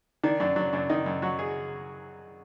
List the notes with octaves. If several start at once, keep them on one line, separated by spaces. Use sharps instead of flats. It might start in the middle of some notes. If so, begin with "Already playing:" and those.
D#3 D4
F#2 D4
F#3 D4
F#2 D4
D#3 D#4
F#2
F#3 F#4
G#4